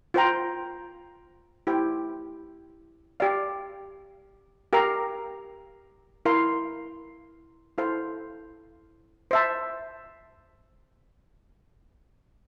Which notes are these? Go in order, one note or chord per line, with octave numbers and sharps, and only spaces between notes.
F4 C5 G5 A#5
E4 G4 C5 G5
G4 D5 F5
G4 A#4 F5 A#5
E4 A#4 F5 C6
E4 A4 C5 F5
C5 E5 A5